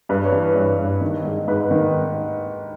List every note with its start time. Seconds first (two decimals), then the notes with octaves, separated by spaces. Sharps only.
0.09 G2 B4
0.25 C#5
0.32 E3
0.56 G2
0.79 G2
1.01 D#3
1.25 G#2
1.48 G#2 B4
1.71 D#3